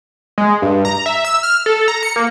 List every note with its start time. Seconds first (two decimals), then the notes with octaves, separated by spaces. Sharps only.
0.38 G#3
0.62 G2
0.85 A#5
1.06 E5
1.25 E6
1.43 F6
1.66 A4
1.88 A#5
2.03 C#7
2.16 A#3